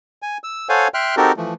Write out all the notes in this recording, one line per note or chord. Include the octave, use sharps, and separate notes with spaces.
G#5
E6
A4 C5 C#5 F5 F#5 G#5
E5 G5 C6 F6 F#6
C4 D#4 F#4 G4 A4 A#4
E3 F3 A3